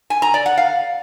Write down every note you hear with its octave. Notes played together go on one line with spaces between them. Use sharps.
G#5
A#5
D5
F#5
F5